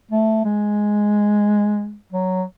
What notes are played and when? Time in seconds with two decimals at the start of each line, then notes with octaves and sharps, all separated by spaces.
0.11 A3
0.45 G#3
2.12 F#3